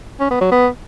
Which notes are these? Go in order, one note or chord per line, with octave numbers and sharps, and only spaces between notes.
C#4
B3
F#3
B3